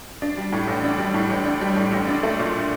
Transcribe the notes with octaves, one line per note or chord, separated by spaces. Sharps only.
D4
G3
A2
A1
D4
G3
A2
A1
D4
G3
A2
A1
D4
A3
A#2